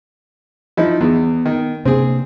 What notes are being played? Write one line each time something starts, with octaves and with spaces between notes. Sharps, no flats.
F3 D#4 E4
E2 B3
D#3
C3 A#3 C4 D4 G#4